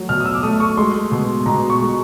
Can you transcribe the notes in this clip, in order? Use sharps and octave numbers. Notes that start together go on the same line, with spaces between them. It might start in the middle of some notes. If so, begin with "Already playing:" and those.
Already playing: F#3 A3
B2 F6
D#6
E6
D6
A3 D#6
C#6
G#3 C6
B2
B2 A#5
C#6
G#3